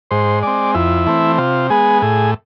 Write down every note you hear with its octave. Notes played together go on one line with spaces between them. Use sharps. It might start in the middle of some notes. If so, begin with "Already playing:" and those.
G#2 C5
G#3 C4 D5
F2 E4
E3 A3 C4
C3 F4
G#3 B3 G#4
A2 G#4